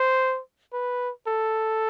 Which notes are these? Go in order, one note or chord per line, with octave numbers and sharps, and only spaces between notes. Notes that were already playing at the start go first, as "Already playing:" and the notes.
Already playing: C5
B4
A4